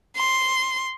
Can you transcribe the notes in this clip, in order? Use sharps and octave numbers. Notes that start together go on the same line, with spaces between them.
C6